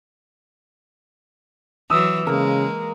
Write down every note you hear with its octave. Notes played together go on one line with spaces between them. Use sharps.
E3 F#3 D#6 E6
C#3 G#3 A#3 A#4